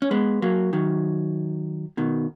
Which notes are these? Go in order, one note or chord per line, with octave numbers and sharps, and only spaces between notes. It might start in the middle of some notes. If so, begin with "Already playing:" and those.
C#4
G#3 B3
F#3 A#3
D#3 F#3
B2 D#3